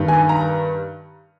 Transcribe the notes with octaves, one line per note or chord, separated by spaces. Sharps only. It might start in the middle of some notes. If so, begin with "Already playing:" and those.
Already playing: G2 D#3
G#5
A#5